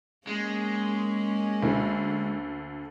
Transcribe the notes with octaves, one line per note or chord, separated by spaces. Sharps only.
G#3 A#3 C#4
D2 D3